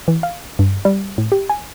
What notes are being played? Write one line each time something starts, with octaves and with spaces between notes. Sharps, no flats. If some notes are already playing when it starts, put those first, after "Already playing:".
E3
F5
G2
G3
A2
G4
G#5